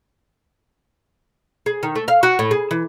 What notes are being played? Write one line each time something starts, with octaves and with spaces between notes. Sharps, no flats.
G#4
D#3
A3
F5
F#4
A2
G#4
E3